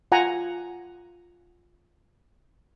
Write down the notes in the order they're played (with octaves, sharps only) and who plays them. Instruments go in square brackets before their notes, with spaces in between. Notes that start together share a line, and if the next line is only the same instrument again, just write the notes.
[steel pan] F4 F#5 G#5 A#5